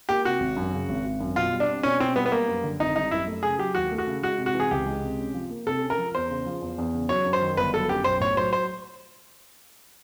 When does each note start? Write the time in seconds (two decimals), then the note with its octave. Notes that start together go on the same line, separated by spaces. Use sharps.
0.09 A#3 G4
0.25 C3 F#4
0.40 G#1
0.56 F#2
0.72 C#3
0.89 G#1
1.04 G#1
1.20 F#2
1.36 B2 F4
1.53 G3
1.60 D4
1.68 C4
1.83 B2 C#4
2.00 B2 C4
2.16 G3 B3
2.26 B3
2.32 G3 A#3
2.48 F#2
2.64 D3
2.80 G#1 D#4
2.95 G3 D#4
3.11 F#2 E4
3.27 A3
3.43 C#3 G#4
3.59 F#3 G4
3.75 D#2 F#4
3.91 A3
3.98 F#4
4.07 C#3
4.22 G#3 F#4
4.38 C3
4.46 F#4
4.54 E3
4.60 G#4
4.71 C#2 G4
4.86 G#3
5.02 C3
5.18 C#4
5.34 F3
5.50 A#3
5.66 C3 A4
5.82 C#4
5.90 A#4
5.98 F3
6.14 E2 C5
6.30 C#3
6.46 F3
6.61 E2
6.78 E2
6.94 C#3
7.09 F#3 C#5
7.25 F#2
7.33 C5
7.41 D#3
7.57 G1 B4
7.74 F#3 A4
7.89 F#2 G4
8.04 B1 C5
8.20 A2 C#5
8.37 F#3 C5
8.53 C5